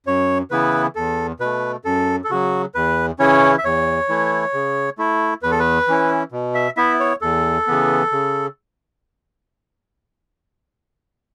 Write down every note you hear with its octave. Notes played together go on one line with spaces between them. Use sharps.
F#2 C#5
C#3 E3 B3 E4 B4
E2 A4
B2 A3 B4
F#2 A4
A4
C#3 F#3 F#4
E2 B4
C#3 E3 C#4 E4 C#5
E5
E2 C#5
E3 A3 E4
C#3
A3 E4
E2 B4
A4
B4
E3 C#4 E4
B2
E5
B3 E4 E5
C#5
E2 A4
C#3 E3 B3
C#3